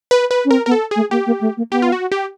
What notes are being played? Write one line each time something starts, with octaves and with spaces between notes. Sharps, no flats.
B4
B4
C#4
C4 A#4
B3 A#4
A4
A3 G#4
A#3 G4
A#3
A3
A#3
B3 G4
F4
F#4
G4